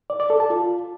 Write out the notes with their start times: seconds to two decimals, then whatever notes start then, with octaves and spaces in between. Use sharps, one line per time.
0.10 D5
0.20 D5
0.30 A4
0.40 A5
0.50 F4